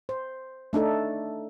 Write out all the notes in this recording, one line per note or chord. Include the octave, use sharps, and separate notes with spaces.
C5
A3 D4 D#4 A4